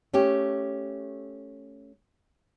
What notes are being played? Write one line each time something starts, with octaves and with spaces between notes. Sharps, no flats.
A3 C#4 G4